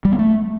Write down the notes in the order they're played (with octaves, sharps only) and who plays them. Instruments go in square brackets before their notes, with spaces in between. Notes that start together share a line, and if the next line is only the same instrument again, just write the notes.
[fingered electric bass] G3
B3
A3